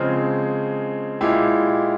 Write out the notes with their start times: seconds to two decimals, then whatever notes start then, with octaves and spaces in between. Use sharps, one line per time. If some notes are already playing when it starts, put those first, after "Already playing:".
Already playing: C#3 F3 G#3 C4
1.21 A#2 G#3 E4 G4